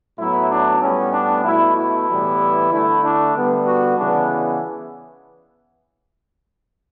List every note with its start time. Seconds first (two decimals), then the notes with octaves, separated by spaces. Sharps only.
0.18 A2 F#3 B3 E4
0.50 D4
0.81 A2 G3 B3 C#4
1.13 D4
1.45 B2 A3 E4
1.76 E4
2.08 A2 E3 G3 B3
2.71 D3 A3 E4
3.03 D4
3.35 D3 G3 B3
3.66 F#4
3.97 C#3 E3 B3 D4